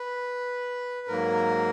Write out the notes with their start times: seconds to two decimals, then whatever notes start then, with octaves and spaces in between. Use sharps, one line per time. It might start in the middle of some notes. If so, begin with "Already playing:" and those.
Already playing: B4
1.08 G#2 F#3 A#3 A#4